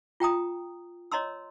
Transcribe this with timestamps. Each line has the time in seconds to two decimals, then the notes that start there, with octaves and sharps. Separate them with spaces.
0.20 F4 G5 A#5 D#6
1.12 C#5 D#5 A#5 C6 E6